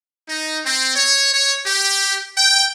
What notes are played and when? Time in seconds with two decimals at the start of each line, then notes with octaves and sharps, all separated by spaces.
0.29 D#4
0.66 C4
0.96 C#5
1.33 C#5
1.66 G4
2.38 G5